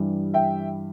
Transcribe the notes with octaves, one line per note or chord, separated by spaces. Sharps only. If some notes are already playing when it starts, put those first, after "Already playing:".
Already playing: G2 E3 G3
E5 G5